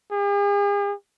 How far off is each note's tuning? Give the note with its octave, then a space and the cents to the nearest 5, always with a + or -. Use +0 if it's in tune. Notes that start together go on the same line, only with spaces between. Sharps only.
G#4 -45